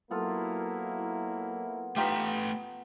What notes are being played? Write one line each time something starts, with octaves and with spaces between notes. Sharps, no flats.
F#3 A#3 B3 E4 F4 A4
A3 D#4 F4 G4 B4